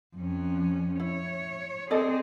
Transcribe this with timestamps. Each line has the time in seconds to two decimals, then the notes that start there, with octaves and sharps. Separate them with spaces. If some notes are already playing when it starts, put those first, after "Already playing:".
0.17 F2 C#4
1.00 E4 C#5
1.91 C4 G#4 A4 D5 D#5